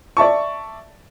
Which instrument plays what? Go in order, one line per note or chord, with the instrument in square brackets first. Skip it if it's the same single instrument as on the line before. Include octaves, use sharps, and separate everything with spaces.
[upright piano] D5 E5 A5 C#6